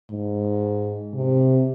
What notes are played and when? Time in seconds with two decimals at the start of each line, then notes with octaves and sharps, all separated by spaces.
0.11 G#2
1.14 C3